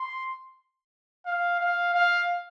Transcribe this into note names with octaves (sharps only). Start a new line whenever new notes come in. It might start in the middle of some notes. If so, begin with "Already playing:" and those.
Already playing: C6
F5
F5
F5